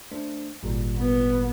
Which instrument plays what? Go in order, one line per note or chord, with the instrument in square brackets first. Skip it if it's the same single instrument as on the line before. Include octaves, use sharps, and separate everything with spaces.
[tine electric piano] A3 D4 C5
G#1 A#2 G3
[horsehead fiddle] B3